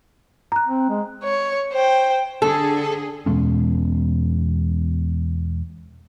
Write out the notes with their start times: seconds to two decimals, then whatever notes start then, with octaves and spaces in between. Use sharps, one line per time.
0.52 A#5 F#6
0.67 C4
0.90 G#3
1.24 C#5
1.73 C5 G5
2.42 D3 G#4 A4
3.26 E2 B2 G#3 C#4